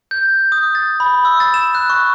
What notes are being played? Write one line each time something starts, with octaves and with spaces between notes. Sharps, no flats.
G6
D#6
A6
B5
E6
A6
E7
F#6
C#6